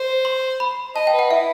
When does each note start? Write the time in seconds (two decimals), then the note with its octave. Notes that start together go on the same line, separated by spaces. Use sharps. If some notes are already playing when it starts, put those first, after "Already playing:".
Already playing: C5
0.25 C6
0.60 B5
0.96 D#5 A5
1.07 G5
1.13 B4
1.19 F#5
1.31 E4 E5